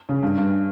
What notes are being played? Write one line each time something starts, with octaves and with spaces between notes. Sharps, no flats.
C#3
G2
G2